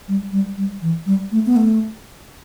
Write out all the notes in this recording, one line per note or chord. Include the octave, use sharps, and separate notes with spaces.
G3
G3
G3
E3
G3
A3
B3
A3